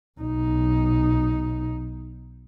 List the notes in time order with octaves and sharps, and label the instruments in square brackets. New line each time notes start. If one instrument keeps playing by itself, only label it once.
[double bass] B1 D#4